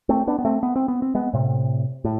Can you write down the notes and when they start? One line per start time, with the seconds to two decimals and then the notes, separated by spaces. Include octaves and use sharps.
0.09 A3 C4
0.27 B3 D4
0.39 B3
0.45 A3 C4
0.63 B3
0.76 C4
0.88 B3
1.02 C4
1.15 G#3 B3
1.33 A2 C3
2.05 A2